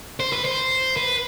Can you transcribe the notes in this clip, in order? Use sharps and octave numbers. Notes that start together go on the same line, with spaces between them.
C5
B4
C5
B4